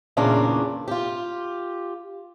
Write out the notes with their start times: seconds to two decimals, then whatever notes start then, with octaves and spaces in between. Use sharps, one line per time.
0.17 E2 A#2 C#3 A#3 C#4 D4
0.88 F4 G4